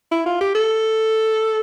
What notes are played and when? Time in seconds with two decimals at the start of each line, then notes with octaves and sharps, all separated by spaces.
0.12 E4
0.26 F4
0.41 G4
0.55 A4